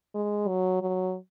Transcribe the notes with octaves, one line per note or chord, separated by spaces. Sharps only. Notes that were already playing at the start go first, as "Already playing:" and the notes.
G#3
F#3
F#3